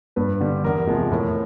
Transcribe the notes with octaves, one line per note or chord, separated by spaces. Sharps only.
G2 B4
D3 G3
E2 A#4
C3 F3 G#3
A2 A#4